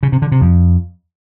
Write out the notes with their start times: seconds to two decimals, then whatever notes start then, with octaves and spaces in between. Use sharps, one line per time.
0.03 C#3
0.12 C3
0.22 D3
0.32 C3
0.41 F2